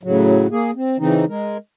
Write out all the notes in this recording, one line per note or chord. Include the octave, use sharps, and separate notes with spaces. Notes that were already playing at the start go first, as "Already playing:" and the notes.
A2 C#3 F#3
A#3 G#4
C4
C#3 E3 C4 D#4
G#3 A#4